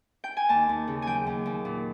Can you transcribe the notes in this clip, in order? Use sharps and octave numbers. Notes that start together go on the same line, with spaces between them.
G5
G#5
D#2 A5
D#2
C#3
F#3 G5 G#5
D#2
D#2
A#2